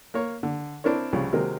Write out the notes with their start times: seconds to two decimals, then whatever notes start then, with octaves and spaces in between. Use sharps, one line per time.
0.14 A#3 A#4 C#5
0.43 D3
0.84 C4 D4 E4 A#4 C#5
1.13 C2 C#3 F3
1.32 C3 D#3 F#3 G#3 C4 A#4